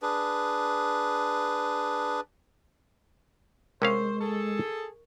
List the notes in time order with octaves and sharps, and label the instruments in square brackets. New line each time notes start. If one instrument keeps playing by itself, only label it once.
[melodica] D4 G#4 B4
[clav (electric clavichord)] C3 C#4 F5 [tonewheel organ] G#3 [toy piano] A#4 C#6 [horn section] C5
[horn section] G#4 A4